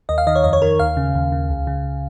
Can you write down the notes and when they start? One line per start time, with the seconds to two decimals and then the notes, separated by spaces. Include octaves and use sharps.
0.09 D#2 D#5
0.18 F5
0.27 D#3 D#5
0.36 C#5
0.44 F2 D#5
0.53 C#5
0.62 D#3 A#4
0.79 D#2 F5
0.97 C#3
1.15 D#2
1.32 C#3
1.50 C#2
1.67 C#3